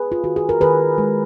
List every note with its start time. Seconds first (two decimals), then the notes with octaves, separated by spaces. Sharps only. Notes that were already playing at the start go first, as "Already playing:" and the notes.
Already playing: G#4 B4
0.12 F4
0.24 D#3 F#4
0.36 G#4
0.49 A#4
0.61 D#3 G#4 B4
0.98 G#3